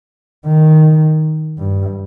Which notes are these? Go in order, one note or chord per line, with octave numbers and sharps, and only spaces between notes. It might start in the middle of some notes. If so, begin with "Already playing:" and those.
D#3
G2